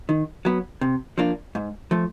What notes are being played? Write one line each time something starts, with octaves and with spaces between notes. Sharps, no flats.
D#3
F#3 B3
C3
F3 A#3 D4
G#2
F3 A3